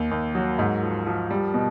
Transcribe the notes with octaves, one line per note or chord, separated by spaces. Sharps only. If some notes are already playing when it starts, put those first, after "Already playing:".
Already playing: D#2
D#2
F#3
G#2
F3
F3
G3
B2